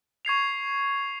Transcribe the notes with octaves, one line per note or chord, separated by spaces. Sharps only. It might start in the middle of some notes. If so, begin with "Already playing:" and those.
C#6 G#6 C7 F7